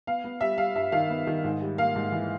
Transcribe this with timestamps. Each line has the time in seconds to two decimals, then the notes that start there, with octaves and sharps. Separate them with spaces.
0.07 B3 F5
0.24 B3
0.41 G3 E5
0.58 G3 F5
0.75 G2 E5
0.92 D#3 F5
1.10 B3
1.27 D#3
1.44 G#2
1.61 G3
1.78 A#3 F5
1.96 G#2
2.12 E3